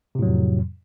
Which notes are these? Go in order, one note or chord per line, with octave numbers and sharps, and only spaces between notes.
F2 A2 C3 F#3